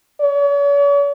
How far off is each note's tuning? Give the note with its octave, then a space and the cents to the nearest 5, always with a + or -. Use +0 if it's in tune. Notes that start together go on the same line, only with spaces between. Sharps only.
C#5 +45